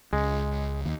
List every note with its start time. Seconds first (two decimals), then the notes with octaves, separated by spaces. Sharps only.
0.13 C#2 G#3
0.86 D#2